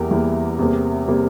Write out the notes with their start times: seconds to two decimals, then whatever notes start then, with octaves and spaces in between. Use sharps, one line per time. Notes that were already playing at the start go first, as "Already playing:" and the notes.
Already playing: E2 E3 G3 A#3 G4 A#4
0.11 E2 E3 G3 A#3
0.59 E2 C3 G3 A#3
1.08 C3 G3 A#3